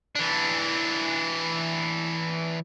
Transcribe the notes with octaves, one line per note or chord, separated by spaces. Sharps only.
E3 D4